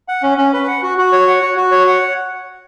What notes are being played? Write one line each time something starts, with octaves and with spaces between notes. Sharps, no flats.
F#5
C#4
C#4
B4
F#5
F#4
F#4
C#5
F#5
F#4
F#4
C#5
F#5